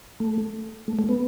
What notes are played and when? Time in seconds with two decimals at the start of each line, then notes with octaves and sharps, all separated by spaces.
0.20 A3
0.88 A3
0.99 A3
1.09 B3